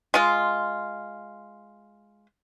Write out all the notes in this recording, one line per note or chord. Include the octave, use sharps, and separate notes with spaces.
G#3 F4